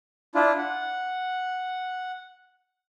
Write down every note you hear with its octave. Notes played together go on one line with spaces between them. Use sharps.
D4 E4 F4
F#5